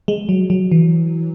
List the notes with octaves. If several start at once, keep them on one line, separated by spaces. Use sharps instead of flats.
G#3
F#3
F#3
E3